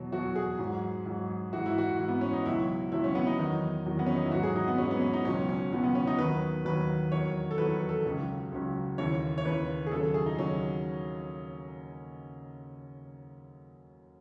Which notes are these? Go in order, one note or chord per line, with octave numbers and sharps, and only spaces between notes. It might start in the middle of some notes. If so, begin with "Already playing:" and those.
Already playing: E2 B2 F#3
E2 B2 F#3 F#4
G#4
G#2 F#3
G#2 F#3
G#2 E3 F#4
E4
F#4
G#2 E3
B3
C#4
D#4
C#2 B2 F#3 E4
C#2 B2 F#3 E4
C#4
B3
D#4
E2 D#3 F#3 D#4
E2 D#3 F#3
B3
C#4
D#4
E4
G#2 F#3 F#4
G#4
D#4
B3
G#2 F#3 C#4
B3
C#4
D#4
C#2 B2 F#3 C#4
C#4
C#2 B2 F#3 B3
B3
C#4
D#4
D#2 D#3 F#3 B4
D#2 D#3 F#3 B4
E2 D#3 F#3 C#5
A4
E2 D#3 F#3 B4
A4
C#2 C#3 F#3
C#2 C#3 F#3
D#2 C#3 E3 C#5
C#5
D#2 C#3 E3 B4
G#4
D#2 C#3 F#3 A4
A4
G#4
D#4
D#2 C#3 F#3 C#4